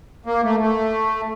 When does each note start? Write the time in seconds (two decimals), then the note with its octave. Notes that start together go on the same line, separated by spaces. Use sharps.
0.26 A#3
0.43 A3
0.60 A3